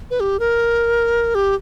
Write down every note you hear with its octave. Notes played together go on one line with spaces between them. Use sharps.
B4
G4
A#4
G4